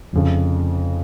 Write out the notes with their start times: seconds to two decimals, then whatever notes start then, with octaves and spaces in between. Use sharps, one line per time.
0.13 F1 F2 C#3